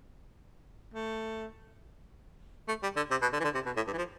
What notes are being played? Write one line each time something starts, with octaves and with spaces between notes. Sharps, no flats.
A3
A3
G3
D3
C3
B2
D3
E3
D3
C3
B2
A2
G2
E3
F3